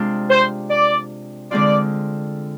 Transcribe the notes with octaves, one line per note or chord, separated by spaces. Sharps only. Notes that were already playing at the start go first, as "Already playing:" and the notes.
Already playing: C3 G#3 D4 F4
C5
D5
D3 G#3 C4 F4 D5